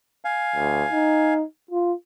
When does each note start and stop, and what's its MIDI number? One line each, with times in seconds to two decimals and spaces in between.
0.25 1.34 77
0.25 1.34 80
0.56 0.84 38
0.92 1.44 63
1.71 1.93 65